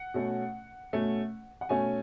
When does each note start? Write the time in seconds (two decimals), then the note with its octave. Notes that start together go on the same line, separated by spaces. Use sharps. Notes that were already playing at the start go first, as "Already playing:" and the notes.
Already playing: F#5
0.14 B2 A3 C#4
0.93 B2 A3 C#4
1.61 F#5
1.69 B2 A3 C#4 G#5